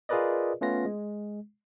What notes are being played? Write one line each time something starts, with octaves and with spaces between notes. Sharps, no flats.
F4 G#4 A#4 B4 D5 D#5
A3 B3 C#4 F4 B4 A#6
G#3